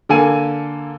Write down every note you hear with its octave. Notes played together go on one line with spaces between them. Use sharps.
D3 A#3 A4 G#5 D#7